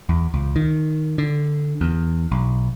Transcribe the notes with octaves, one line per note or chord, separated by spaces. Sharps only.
E2
C#2
D#3
D3
E2
B1